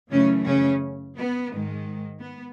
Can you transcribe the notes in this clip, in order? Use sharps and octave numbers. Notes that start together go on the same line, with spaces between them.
F#2 C#3 E3 A3 C#4
C#3 C#4
B3
G#2 D#3 G#3
B3